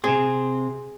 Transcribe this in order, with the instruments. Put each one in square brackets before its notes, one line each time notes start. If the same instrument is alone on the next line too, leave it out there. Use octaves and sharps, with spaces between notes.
[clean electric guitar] C3 C4 [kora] G#4